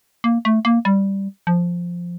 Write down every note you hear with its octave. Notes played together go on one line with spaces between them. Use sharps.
A#3
A3
A#3
G3
F3